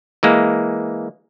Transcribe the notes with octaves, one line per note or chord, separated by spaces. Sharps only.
E3 G#3 A#3